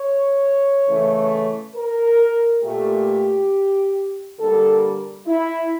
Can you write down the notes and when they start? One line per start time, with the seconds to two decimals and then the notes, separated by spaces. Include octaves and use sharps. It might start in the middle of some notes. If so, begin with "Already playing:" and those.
Already playing: C#5
0.87 C#3 E3 A3
1.75 A#4
2.63 A#2 A3 G4
4.39 D3 G3 A#3 A4
5.27 E4